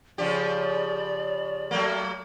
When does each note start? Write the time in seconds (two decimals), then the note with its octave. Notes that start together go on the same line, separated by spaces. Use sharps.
0.18 C#3 F3 G4 D5
1.71 F#3 A3 A#3